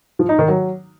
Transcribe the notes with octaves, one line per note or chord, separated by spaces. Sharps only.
F3
D#4
D#3
F#3